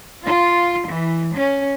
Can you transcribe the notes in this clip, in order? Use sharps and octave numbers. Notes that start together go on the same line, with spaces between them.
F4
E3
C#4